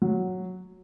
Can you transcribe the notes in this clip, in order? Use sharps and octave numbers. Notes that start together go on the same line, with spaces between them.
F#3